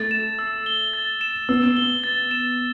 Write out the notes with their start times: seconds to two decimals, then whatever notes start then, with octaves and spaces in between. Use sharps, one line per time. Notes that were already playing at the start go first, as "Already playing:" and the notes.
Already playing: A3 A6
0.11 E7
0.39 E6
0.66 G7
0.94 A6
1.21 E7
1.49 B3 E6
1.77 G7
2.04 A6
2.31 E7